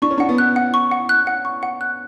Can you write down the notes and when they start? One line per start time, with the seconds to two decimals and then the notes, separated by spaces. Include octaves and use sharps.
0.02 D4 C#6
0.11 C#4
0.18 D4 F#5
0.29 B3
0.38 F#6
0.56 F#5
0.74 C#6
0.91 F#5
1.09 F#6
1.27 F#5
1.45 C#6
1.63 F#5
1.81 F#6